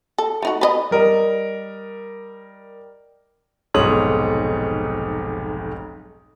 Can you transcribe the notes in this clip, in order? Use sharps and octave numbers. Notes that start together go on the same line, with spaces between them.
A4
A3 D#4 F#4
B4 C5 D#5
G3 A#4 D#5
F1 B1 G#2 C#5 D#6 F#7